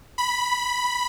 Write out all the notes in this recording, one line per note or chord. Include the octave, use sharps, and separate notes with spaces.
B5